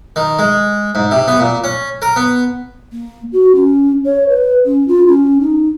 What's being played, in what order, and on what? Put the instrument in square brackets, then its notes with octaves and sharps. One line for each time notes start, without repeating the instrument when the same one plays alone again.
[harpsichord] D#3
G#3
G#2
C3
B3
A#2
C#4
A#4
B3
[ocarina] A#3
F#4
C#4
C#5
B4
C#4
F4
C#4
D#4